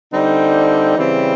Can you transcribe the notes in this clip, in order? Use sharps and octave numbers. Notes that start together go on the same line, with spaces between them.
D3 G3 C4 D#4
C#3 E3 G3 C4